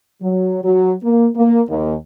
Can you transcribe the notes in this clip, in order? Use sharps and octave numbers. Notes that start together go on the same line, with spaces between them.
F#3
F#3
A#3
A#3
D#2